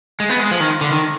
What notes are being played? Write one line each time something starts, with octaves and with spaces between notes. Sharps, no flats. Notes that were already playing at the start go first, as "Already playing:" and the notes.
G#3
B3
G#3
F3
D#3
D3
D#3